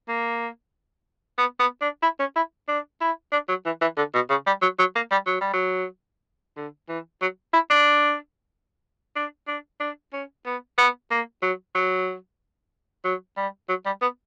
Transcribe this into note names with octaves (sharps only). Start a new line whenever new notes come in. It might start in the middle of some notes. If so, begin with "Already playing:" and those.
A#3
B3
B3
D4
E4
C#4
E4
D4
E4
D4
F#3
E3
E3
D3
B2
C#3
G3
F#3
F#3
A#3
G3
F#3
G3
F#3
D3
E3
F#3
E4
D4
D4
D4
D4
C#4
B3
B3
A#3
F#3
F#3
F#3
G3
F#3
G3
B3